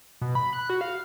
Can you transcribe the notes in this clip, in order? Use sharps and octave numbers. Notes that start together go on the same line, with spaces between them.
B2
B5
F#6
F#4
F5